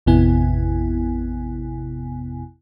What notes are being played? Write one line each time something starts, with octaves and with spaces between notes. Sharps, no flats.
A1 F2 C3 B3 E4 G#5